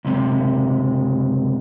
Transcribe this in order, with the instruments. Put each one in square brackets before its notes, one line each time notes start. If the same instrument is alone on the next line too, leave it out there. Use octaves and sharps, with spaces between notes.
[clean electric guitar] C#2 F#2 C3